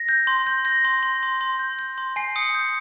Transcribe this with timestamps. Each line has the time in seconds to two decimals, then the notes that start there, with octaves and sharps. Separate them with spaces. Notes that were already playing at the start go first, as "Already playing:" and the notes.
Already playing: A#6
0.09 G6
0.27 C6
0.47 G6
0.65 G6 A#6
0.85 C6
1.03 C6
1.23 C6
1.41 C6
1.59 G6
1.79 G6
1.98 C6
2.16 G#5 C7
2.36 D#6 C#7
2.55 G6